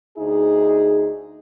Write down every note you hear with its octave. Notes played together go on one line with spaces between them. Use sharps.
D2 D#4 G#4